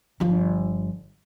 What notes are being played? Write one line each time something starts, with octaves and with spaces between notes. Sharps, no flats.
G1 F3